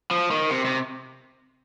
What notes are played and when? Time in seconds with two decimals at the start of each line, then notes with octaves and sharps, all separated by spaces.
0.11 F3
0.31 D#3
0.51 C3
0.65 C3